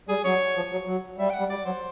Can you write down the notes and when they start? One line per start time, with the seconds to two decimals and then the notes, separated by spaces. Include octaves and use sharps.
0.09 G3 G#4
0.24 F#3 C#5
0.56 F3
0.72 F#3
0.87 F#3
1.18 G3 E5
1.30 G5
1.34 F#5
1.39 G3
1.50 G3 D5
1.65 F#3 C5